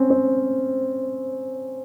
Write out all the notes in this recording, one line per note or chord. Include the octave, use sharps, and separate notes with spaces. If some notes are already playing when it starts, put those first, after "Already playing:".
Already playing: C4 C#4
C4